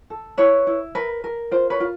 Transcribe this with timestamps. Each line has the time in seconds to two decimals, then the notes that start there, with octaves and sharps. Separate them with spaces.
0.10 A4
0.37 E4 B4 C#5
0.67 E4
0.95 A#4 B4
1.24 A#4
1.51 F4 C5
1.70 B4 C#5
1.80 F4